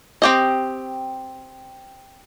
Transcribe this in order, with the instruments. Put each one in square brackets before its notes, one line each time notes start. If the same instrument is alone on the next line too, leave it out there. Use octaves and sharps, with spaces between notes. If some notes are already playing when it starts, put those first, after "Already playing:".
[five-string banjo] C4 G4 D#5